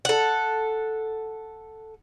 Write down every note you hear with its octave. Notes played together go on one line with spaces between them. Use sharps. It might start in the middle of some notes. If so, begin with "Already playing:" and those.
A4 F#5